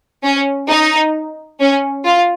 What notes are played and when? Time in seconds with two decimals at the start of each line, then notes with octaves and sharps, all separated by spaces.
0.24 C#4
0.69 D#4
1.60 C#4
2.05 F4